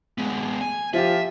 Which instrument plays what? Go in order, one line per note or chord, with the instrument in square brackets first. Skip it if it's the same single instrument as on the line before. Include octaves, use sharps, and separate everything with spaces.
[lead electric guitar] G#3 B3
G#5
[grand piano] F3 F4 G4 [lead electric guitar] E5